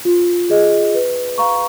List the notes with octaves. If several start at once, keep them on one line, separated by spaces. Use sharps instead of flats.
F4
G#4 D#5
B4
F5 A#5 C#6